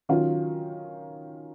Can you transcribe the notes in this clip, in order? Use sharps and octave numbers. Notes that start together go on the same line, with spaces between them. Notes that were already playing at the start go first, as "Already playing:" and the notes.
D#3 F#3 C#4 F4